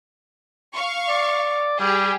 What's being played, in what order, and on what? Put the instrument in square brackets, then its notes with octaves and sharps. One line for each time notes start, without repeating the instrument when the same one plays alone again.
[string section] F5 C#6
[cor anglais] D5
[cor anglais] G3 [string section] G4 G#4